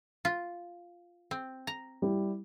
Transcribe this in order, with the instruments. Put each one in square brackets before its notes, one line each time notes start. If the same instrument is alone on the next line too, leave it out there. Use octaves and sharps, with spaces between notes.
[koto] F4
C4
A#5
[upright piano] G3 E4 G4